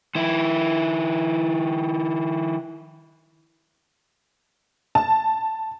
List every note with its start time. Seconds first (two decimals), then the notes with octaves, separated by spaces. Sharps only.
0.15 D#3 E4
4.95 A5